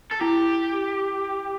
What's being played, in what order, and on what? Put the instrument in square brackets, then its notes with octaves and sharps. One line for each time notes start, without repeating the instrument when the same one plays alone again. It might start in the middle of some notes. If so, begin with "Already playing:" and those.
[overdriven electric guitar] A4
[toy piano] E4 [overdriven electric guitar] G4